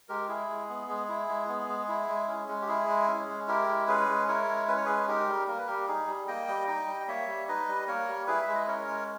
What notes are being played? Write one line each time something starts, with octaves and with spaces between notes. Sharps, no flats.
G#3 G4 A#4
E4 G#4
G#3
B3
G#3
E4
G#3
B3
G#3
E4
G#3
C#4
G#3
G4
E4 G#4
G#3
C#4
G#3
E4 G4 A#4
G#3
C#4 G#4 B4
G#3
E4 A#4 C#5
G#3
C#4 B4
C#5
G#3 G#4 B4
D#4 G4 A#4
G3
A#3 A#4
B4
G3 G4 A#4
D#4 G#4
G3
A#3 D#5 G5
G3
D#4 D#5 G5
G3
G5
A#3 C#5 E5
G3
D#4 B4 D#5
G3
A#3 A#4 C#5
G3
E4 G#4 B4
E5
G#3
D#5
C#4 A#4 C#5
G#3